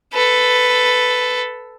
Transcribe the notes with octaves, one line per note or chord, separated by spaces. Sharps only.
A4 B4